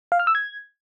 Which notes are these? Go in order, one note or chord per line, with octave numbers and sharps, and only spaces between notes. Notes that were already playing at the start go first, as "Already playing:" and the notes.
F5
F6
E6
G#6